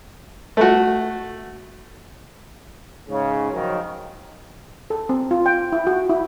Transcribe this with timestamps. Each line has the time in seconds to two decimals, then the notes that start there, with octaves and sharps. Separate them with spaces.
0.57 A3 F#4
3.08 G#2 C#3
3.53 D#3 F3 F#3 F4 A#4
4.90 A4
5.09 C4
5.31 F4
5.46 G5
5.72 E4
5.87 F#4
6.10 E4